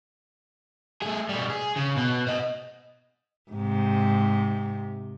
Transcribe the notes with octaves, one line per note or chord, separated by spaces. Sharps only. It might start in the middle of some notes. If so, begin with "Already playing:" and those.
A3 G#4
B2 G3
G#4
C#3
B2
C5 D#5
G#2 C3